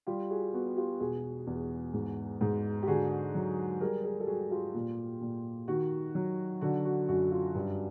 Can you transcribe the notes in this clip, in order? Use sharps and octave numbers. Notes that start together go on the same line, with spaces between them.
G3 F4 G4
F#4 G#4
B3 F#4
F4 G4
E1 F#4 G#4
E2
G#2
G#2
G4
D3 F#4 G#4
F#3
G3 G#4 A#4
G#4 A#4
A4
G3 F#4 G#4
F4 G4
A#2
A#2
D#3 F#4
F#3
D3 F#4
F#4
F#2 F#4
F4
G2